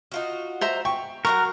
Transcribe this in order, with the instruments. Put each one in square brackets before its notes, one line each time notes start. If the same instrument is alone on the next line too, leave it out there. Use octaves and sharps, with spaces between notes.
[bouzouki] D#4 F4 F#4
[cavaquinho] C5 E5 A#5
[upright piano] G5 [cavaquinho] C#6
[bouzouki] F#3 F#4 F5 [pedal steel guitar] A#4 [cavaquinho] C#6